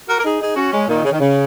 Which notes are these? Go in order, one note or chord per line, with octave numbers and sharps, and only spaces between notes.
F#4 A#4
A#4
D#4 G#4
D#4 G#4
C#4 F#4
G#3 C#4
A#2 D#3
C#3
D#3
C#3